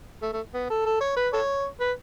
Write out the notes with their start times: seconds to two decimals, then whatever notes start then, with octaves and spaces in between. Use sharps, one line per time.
0.22 A3
0.33 A3
0.54 B3
0.70 A4
0.86 A4
1.01 C#5
1.17 B4
1.33 A4 C#5
1.80 B4